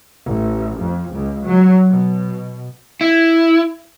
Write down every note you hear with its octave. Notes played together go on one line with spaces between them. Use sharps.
A1
F2
C#2
F#3
B2
E4